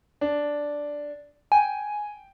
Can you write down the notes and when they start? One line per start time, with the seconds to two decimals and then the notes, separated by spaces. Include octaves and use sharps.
0.21 D4
1.52 G5 G#5